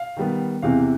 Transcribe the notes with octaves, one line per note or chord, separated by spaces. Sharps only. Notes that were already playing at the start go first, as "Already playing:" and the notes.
Already playing: F5
D#3 G3 B3
E2 C3 E3 F5